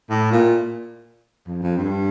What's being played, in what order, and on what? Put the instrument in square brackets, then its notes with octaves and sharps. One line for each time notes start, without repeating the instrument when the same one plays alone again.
[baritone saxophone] A2
A#2
F2
F2
G2